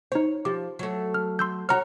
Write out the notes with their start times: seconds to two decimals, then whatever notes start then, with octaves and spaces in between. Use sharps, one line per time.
0.12 D#4 C5 C#5
0.45 F3 G4 D6
0.79 F#3 A3
1.14 F6
1.39 C6 E6 G6
1.69 F#4 C#5 A#5 F6